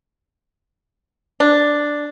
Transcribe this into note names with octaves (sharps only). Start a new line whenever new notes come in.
D4